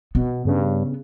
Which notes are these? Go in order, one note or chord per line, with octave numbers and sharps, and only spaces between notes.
B2 B3
G2 C#3